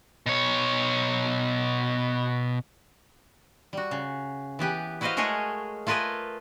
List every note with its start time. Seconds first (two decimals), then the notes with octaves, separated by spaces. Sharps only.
0.26 B2 C#5
3.73 G3 F#4
3.91 C#3
4.59 E3 B3 G4 B4
5.01 E4 F#4 B4 C5 D#5 F5
5.17 G#3 A3 G#4 A#4 C#5 D#5
5.87 A3 F4 A#4 B4 D#5 G#5